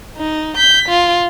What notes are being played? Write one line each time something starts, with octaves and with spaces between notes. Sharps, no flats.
D#4
G6 B6
F4